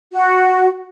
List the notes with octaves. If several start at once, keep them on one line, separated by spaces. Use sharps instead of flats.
F#4